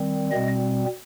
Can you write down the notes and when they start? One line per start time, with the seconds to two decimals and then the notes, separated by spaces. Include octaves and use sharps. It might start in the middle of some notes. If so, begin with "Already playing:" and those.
Already playing: D#3 G3 C4
0.32 B2 G3 C4 D#5